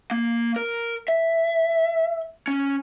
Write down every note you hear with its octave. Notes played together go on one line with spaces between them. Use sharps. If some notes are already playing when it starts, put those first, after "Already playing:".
A#3
A#4
E5
C#4